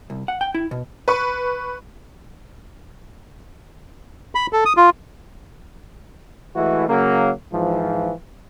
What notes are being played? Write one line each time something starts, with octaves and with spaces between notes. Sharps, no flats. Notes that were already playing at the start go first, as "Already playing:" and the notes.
C2
F#5
G5
E4
B2
B4 C#6
B5
A4
D#6
F4
E3 G#3 A3 E4 F#4
C#3 F#3 A#3
G#2 E3 F3